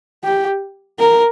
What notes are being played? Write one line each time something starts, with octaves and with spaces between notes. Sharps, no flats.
G4
A#4